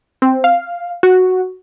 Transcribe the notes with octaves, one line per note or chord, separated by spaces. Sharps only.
C4
F5
F#4